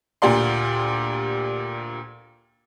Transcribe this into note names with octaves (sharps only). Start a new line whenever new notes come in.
D2 A#2 G4 D5 C6